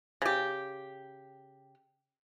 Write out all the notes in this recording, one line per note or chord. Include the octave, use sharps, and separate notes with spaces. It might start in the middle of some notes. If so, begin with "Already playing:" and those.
C#3 G4